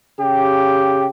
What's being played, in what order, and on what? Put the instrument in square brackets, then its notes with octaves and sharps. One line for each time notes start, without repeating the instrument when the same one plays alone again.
[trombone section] C#3 G4